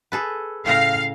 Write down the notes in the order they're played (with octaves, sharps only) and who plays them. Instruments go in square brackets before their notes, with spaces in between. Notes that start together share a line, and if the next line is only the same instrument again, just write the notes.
[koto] G#4 A4 B4
[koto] A2 C#3 A#5 [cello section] F5